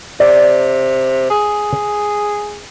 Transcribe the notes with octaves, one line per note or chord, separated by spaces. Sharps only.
C3 D5
G#4